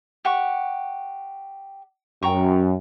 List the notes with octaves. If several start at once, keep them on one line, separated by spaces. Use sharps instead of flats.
G4 F#5 C#6
F#2 G5 A#5 C#6